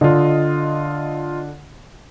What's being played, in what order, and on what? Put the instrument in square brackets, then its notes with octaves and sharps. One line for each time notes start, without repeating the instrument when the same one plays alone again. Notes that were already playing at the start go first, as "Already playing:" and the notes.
[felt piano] D3 [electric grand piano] F4 D#5